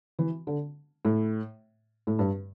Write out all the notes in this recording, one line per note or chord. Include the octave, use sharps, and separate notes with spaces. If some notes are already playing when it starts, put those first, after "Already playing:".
E3
D3
A2
A2
G2